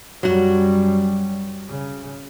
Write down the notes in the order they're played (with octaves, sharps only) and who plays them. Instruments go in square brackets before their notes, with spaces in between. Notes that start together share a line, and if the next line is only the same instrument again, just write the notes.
[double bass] F#2 G3 [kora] F#3 F#4
[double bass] C#3